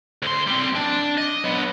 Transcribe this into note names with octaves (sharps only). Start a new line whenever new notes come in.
D2 C6
G3 C4
D4
D#5
F#3 B3